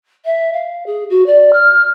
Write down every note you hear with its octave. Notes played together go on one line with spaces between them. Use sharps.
E5
F5
G#4
F#4
D5
F6